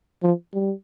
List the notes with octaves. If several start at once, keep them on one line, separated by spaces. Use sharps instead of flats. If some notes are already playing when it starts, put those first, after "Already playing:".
F3
G3